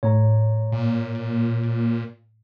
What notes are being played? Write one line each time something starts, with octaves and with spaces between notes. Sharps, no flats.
A2 C#5 A#5
A#2